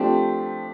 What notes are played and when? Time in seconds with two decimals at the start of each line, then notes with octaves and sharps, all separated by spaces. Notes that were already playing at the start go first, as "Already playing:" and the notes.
Already playing: F3 A3 C4 D4 G4